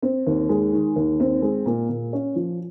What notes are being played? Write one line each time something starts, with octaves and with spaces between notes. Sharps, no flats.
C4
D#2
G#3
D#3
D#2
C4
G#3
A#2
A#2
C#4
F3